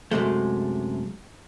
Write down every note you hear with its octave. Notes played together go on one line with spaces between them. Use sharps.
F#2 C3 G#3 A3